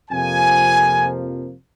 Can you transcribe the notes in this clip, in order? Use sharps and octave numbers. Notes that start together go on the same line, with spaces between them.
F2 C3 F3 A#3 G#5